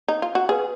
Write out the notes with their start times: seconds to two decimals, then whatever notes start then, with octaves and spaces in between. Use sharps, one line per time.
0.08 D#4
0.22 F4
0.35 F#4
0.49 F#4 G#4 B4 F#5